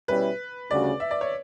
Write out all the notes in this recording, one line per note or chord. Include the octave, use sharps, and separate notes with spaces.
B2 G3 C#4 E4 B4
D2 C#3 G3 C#4 F#4 D5
E5
D5
C#5